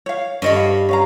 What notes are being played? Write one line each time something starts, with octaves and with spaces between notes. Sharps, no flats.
C#5 F5
G2 C#4 C#5 D#5 B5
F5
C#4 F5 A#5